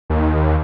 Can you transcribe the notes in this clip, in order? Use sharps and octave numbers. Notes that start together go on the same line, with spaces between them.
D#2